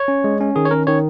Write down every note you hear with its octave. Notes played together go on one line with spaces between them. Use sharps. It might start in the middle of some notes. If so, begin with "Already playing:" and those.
Already playing: C#5
C#4
G#3
C#4
D#3 G#4
C#5
C#4 A#4
D#3 C#5